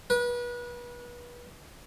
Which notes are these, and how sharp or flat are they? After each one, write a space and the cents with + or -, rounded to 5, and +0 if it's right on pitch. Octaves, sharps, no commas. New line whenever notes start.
B4 -30